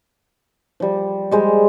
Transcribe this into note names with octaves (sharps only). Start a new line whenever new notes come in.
F3 G3
G3 G#3 C5